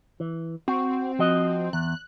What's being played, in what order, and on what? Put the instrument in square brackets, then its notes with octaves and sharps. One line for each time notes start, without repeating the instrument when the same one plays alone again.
[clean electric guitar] E3
[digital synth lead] C4 [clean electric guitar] F#4
[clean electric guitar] F3 F#4 D#5
[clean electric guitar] E2 [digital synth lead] F#6